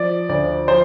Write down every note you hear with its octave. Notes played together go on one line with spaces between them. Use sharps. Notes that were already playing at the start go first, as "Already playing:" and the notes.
Already playing: F3 D5
D2 D5
F3 C5